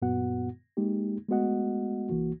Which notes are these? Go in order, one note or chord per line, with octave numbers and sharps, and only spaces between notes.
F#2 A#2 B3 F#4 F#5
G#3 A#3 D#4 G4
G#3 A3 B3 F#4 D#5 F#5
C2 E3 A#3 F#4